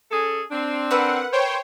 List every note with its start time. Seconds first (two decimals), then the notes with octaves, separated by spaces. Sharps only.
0.12 C#4 G#4 A4
0.51 C4 D4
0.91 A#4 B4 F#5 E6
1.32 C5 C#5 G5